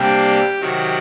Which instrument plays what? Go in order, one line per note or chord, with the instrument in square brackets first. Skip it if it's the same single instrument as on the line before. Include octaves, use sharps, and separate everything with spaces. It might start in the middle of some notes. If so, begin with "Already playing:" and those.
Already playing: [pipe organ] C3 G3 A#3 D4 G4
C3 D#3 F#3 F#4